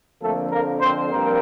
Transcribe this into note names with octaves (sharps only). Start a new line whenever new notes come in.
F2 D3 F3 A3 A#3 A4
A#3 A#4
C4 C5
G2 F3 A#3 C4 A#4